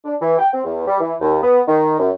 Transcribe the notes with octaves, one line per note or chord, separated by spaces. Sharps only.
D4
E3
G5
C4
E2
G3
E3
D#2
B3
D#3
F#2